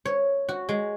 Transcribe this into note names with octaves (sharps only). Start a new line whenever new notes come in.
C#5
F#4
G#3